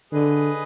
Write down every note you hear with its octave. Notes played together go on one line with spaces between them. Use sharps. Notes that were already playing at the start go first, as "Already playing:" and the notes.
D3 G#4 B4 D#5